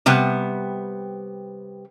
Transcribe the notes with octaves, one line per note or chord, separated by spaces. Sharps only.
C3 G3 B3